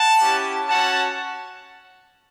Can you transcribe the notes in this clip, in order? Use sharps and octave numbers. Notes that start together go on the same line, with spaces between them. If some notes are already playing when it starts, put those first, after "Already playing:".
Already playing: F#5 A5
C#4 E4 G4
C#4 F#4 F#5 A5